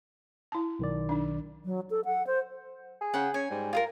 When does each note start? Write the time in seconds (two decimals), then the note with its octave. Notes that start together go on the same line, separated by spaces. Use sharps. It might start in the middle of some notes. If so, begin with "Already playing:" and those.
0.52 E4 A5
0.79 B1 D#3 D5
1.09 D4 D#4
1.65 F#3
1.90 A4
2.05 F#5
2.27 C5
3.01 G#4
3.14 C#3 F#5 G5
3.34 C#4 G#5
3.50 G#2 G3
3.73 F4 G#4 A#4